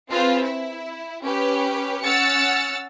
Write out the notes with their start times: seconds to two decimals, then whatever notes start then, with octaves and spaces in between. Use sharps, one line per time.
0.10 C4 F4 G#4 B4 C5
0.43 E4
1.22 C#4 G4 B4
2.03 C#4 F#5 E6 F6 A6 C#7